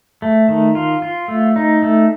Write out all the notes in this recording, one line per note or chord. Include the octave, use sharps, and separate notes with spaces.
A3
D#3
F4
F4
A3
D#4
A3